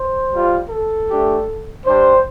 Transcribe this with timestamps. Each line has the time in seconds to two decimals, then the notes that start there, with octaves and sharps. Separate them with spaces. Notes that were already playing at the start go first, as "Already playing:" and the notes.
Already playing: C5
0.31 G3 F4
0.70 A4
1.09 A3 D4 G4
1.85 G3 D4 G4 C5